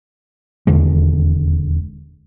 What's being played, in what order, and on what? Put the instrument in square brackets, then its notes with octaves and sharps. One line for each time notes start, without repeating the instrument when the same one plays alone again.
[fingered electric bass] D#1 E2 D3 G#3